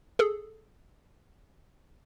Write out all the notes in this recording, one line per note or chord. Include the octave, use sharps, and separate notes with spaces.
G#4 A4